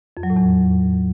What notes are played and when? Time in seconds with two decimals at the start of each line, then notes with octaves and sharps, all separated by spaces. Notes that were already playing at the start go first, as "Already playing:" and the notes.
0.17 F2
0.23 F#3
0.30 A2
0.36 E2